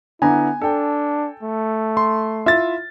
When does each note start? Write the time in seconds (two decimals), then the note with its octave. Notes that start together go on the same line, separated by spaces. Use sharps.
0.22 D3 B3 E4 G#5 A#5
0.61 D4 A4 G5
1.43 A3
1.97 C6
2.46 E4 F4 E5 A6